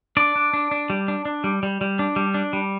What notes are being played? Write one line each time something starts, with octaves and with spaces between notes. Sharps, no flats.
D4 D5
D4
D4
D4
G3
D4
D4
G3
G3
G3
D4
G3
D4
G3